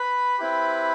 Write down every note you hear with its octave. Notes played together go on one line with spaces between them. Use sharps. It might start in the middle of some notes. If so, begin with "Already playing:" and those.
Already playing: B4 B5
C4 E4 G4